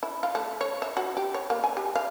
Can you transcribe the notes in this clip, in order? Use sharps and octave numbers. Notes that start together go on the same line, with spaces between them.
E4
F4
A3
C#5
E5
F#4
G4
C#5
A#3
G#5
G4
F5